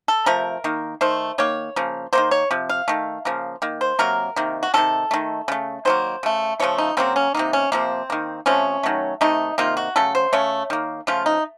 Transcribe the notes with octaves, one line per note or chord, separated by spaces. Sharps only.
A4
C3 F3 A3 A#4
D#3 A#3
D#3 A3 C5
D#3 A#3 C#5
C#3 F3 A#3
D#3 F#3 A#3 C5
C#5
C3 F3
F5
D#3 A3
C#3 F3 A#3
D#3 A#3
C5
C3 F#3 A#3 A#4
C3 D#3 A#3
F#4
C3 D#3 F#3 A3 A4
D#3 A3
C#3 A3
D#3 F#3 A#3 C5
C#3 A3
C#3 F3 A3 C#5
D#4
C#3 F#3 A#3 C4
C#4
C3 D#3 A#3 D#4
C#4
C3 F3 A#3 C4
D#3 A#3
C3 F3 A3 C#4
D#3 F#3 A3
C3 D#3 A3 D#4
C3 D#3 A#3 F4
F#4
C#3 F#3 A3 A4
C5
C#3 A3 C#5
D#3 A#3
C#3 F3 A3 F4
D#4